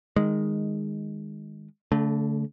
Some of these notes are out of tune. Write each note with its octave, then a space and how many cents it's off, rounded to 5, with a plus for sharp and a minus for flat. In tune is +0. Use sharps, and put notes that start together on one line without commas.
D#3 +0 G#3 -10
D3 -35 A3 +0